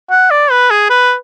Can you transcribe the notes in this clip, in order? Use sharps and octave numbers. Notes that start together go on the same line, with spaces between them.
F#5
D5
B4
G#4
B4